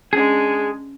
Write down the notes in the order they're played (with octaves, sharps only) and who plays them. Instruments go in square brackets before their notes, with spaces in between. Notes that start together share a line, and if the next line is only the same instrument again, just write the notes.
[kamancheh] G#3 D4 [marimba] C#4 [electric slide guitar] G#4